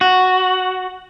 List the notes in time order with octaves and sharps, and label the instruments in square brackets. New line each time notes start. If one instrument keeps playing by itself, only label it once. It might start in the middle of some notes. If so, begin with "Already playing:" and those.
[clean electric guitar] F#4